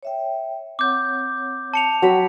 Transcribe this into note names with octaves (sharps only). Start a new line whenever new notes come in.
C#5 E5 G5
C4 C#5 F#5 D6 G6
A5 C#7 F7
F#3 G5 B5 E6